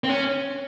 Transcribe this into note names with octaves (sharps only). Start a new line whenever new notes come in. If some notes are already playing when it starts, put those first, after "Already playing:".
C4
C#4